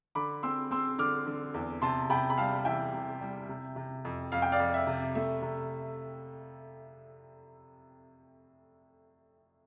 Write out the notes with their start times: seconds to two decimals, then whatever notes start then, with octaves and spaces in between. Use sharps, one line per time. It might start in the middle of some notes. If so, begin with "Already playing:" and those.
0.15 D3 B5 D6
0.43 C4 C6 E6
0.71 C4 C6 E6
0.98 D3 D6 F6
1.27 D3
1.54 E2
1.82 C3 A5 C6
2.10 C3 G5 B5
2.30 B5
2.37 G3 F5 A5
2.65 E3 E5 G5
2.93 C3
3.21 G3
3.49 C3
3.76 C3
4.05 F2
4.32 F2 F5
4.42 G5
4.52 D5 F5
4.60 F2
4.74 E5
4.87 C3
5.15 A3 E5
5.42 C3